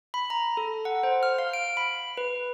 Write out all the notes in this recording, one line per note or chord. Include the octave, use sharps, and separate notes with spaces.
B5
A#5
A4
F#5
C5
F6
F5
D7
B5
B4